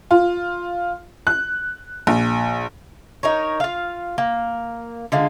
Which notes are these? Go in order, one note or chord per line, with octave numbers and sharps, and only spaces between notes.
F4
F#6
A#1
D#4 A#4 C#5
F4 F5
A#3
D3 G#3 F4